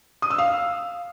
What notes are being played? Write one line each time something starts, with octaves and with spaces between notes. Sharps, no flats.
D#6
E6
F5